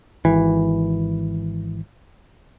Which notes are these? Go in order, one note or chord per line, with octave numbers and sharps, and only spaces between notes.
G#1 E3